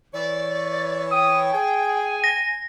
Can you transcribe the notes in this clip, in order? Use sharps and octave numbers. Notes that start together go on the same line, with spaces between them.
E3 C#5 D5
G5 D#6
G#4 G#5
A#6